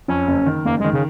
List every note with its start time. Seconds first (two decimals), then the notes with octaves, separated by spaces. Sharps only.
0.08 F2 C#4
0.28 F#1
0.46 D#3
0.65 F#1 A#3
0.80 D#3 G#3
0.93 C#3